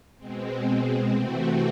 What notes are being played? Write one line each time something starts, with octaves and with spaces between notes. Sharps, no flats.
B2 G#3 C4
C3 E3 A3 C4 F#4